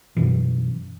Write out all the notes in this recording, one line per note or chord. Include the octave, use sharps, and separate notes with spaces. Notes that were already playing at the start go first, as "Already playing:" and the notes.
F#2 B2 E3